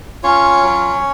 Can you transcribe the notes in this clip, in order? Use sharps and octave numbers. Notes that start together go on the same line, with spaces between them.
C#4 F4 C#5
F#3